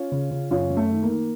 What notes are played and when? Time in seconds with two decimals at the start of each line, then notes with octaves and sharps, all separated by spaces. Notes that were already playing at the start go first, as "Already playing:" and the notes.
Already playing: C#4 F4
0.12 C#3
0.31 C#3
0.51 F#2 C#4 F4
0.70 F#2
0.77 A3
0.90 D#3
1.03 A#3
1.09 D#3